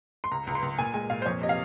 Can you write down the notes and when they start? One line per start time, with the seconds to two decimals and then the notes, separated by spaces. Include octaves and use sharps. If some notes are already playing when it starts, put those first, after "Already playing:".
0.24 C6
0.31 C#2 A#5
0.47 C#2 A#5
0.55 C6
0.62 C#2
0.79 A#2 G#5
0.94 G#3 G#5
1.10 A#2 F5
1.22 C5
1.26 F2 C#5
1.41 C3 D#5
1.49 F5